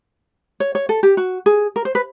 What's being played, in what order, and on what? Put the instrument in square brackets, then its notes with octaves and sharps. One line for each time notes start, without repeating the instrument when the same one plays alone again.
[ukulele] C#5
C#5
A4
G4
F#4
G#4
A#4
C5
B4